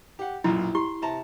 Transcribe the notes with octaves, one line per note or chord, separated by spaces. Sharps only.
G4 F#5
B1 F#2 A#2 E4
E4 G4 C6
C3 A5 A#5